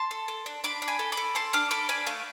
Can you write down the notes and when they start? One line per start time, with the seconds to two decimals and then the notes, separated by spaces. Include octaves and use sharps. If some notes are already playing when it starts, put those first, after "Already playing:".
Already playing: A5 C6
0.11 A4
0.28 A4
0.46 D4
0.64 D4 B5 D6
0.82 D4
0.88 G#5 B5
0.99 A4
1.12 B5 D6
1.17 A4
1.35 A4 A5 C6
1.53 D4 D6 F6
1.71 A4 B5 D6
1.89 D4 G#5 B5
2.06 A3 F5 A5